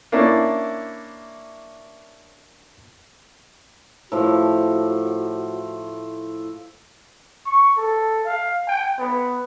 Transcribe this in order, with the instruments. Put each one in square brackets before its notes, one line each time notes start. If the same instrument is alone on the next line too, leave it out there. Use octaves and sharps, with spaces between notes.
[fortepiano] A#3 C#4 D4 E4
[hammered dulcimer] A2 F3 [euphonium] F#4
[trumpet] C#6
A4
F5
G5
B3